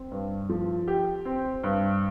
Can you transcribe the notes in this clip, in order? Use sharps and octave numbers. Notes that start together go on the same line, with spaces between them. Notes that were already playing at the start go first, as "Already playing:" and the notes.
Already playing: C4
G2
F3
G4
C4
G2